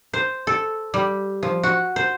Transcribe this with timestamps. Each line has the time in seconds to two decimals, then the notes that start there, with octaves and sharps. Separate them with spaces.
0.13 C5
0.47 A4
0.94 G3
1.43 F3
1.63 F#4
1.96 C5